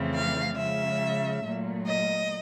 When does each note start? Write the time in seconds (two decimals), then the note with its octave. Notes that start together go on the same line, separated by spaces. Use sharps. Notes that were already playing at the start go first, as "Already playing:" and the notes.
Already playing: F2 C#3 E3 A3 C4
0.13 F5
0.57 C#3 F3 G#3 E5
1.44 A#2 F#3 A3
1.87 D#5